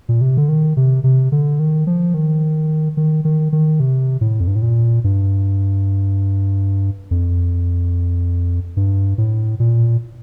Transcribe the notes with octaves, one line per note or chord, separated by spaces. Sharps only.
A#2
C3
D3
D#3
C3
C3
D3
D#3
F3
D#3
D#3
D#3
D#3
C3
A2
F2
G2
A2
A#2
G2
F2
G2
A2
A#2